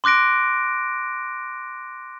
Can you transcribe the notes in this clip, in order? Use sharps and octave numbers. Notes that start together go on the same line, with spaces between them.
C6 D6 F#6 A#6 D7